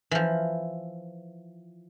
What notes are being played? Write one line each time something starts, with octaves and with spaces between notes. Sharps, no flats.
E3 F3